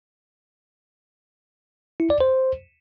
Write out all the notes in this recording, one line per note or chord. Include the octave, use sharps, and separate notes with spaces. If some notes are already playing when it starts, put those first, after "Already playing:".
E4
D5
C5